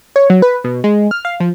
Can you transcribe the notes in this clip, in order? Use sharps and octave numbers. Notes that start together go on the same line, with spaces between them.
C#5
F#3
B4
B2
G#3
F6
F5
F3